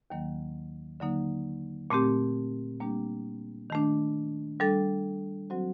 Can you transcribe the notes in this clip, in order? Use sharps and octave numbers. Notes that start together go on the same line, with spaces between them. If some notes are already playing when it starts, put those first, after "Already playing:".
D#2 D#3 F#3 A#3
D3 F#3 A#3 D#4
A#2 A3 C4 G4
G3 A#3 D4 G4
D#3 A3 D4
G3 D4 A4
F#3 C4 F#4 C5